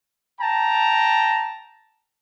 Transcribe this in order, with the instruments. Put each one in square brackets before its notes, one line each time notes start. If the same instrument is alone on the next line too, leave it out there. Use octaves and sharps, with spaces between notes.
[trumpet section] G5 A5 A#5